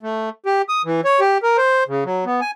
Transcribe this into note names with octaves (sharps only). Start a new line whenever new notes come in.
A3
G4
D#6
E3
C#5
G4
A#4
C5
C#3
F#3
B3
G#5